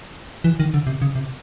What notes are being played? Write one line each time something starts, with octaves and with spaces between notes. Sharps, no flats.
E3
D#3
D3
C3
C#3
C3